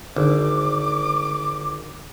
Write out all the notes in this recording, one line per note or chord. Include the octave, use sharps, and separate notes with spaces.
G#1 D3 D6